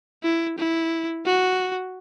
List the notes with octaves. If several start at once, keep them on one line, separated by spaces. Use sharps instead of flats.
E4
E4
F#4